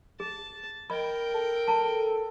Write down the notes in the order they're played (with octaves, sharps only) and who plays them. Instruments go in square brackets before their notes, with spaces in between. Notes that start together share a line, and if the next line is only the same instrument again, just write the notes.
[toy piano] G#4 [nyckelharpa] A5
[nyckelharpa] A#4 G5 [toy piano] D#5 B5
[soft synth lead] A4
[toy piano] A5 A#5